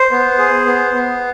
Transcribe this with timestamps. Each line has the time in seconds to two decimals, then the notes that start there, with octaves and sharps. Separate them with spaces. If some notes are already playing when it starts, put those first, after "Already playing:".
Already playing: C5
0.11 B3
0.38 G#4
0.66 B3
0.94 B3